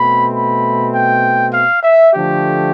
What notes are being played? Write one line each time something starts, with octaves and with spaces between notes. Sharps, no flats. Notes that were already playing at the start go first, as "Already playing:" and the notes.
Already playing: B2 A3 C4 B5
B5
G5
F5
E5
D3 F3 A3 G4